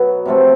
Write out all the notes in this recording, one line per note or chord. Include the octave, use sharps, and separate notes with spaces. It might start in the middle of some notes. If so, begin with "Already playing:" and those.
Already playing: B2 F#3 B3
C3 F3 A3 C4